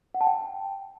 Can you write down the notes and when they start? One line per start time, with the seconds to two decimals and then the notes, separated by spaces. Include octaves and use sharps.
0.14 F#5
0.21 A5
0.27 G5